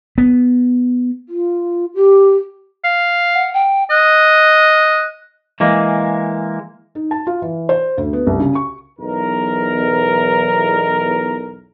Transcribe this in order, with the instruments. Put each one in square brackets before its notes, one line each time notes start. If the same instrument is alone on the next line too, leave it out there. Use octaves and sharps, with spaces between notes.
[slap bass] B3
[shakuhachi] F4
G4
[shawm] F5
[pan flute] F#5
G5
[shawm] D#5 [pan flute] F#6
[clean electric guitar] E3 G#3 A#3
[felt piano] D#4
A5
F4
E3
C5
D2
B3
C2
C#3
C#6
[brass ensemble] B1 E2 A#4